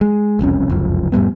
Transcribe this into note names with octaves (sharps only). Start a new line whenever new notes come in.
G#3
E1 C2 F2 C#4
F1 C#2 F#2 F3
F2 A2 G3 B3